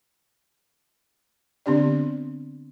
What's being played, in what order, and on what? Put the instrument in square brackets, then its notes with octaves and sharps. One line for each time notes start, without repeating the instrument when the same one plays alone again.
[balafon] D3 B3 C4 D4 G4 D5